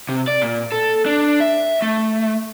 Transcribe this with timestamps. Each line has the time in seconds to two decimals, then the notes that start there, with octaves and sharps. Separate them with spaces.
0.09 C3
0.28 D5
0.42 A#2
0.72 A4
1.06 D4
1.40 E5
1.82 A3